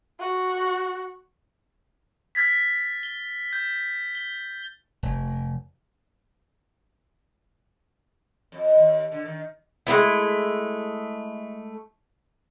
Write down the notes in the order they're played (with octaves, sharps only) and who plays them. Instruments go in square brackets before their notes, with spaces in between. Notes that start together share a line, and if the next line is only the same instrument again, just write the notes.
[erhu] F#4
[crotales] F6 G#6 A6 B6
G7
G6
G7
[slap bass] F1
[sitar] F2
D#2
D3
D#3
[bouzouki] G#3 A3 B3 E4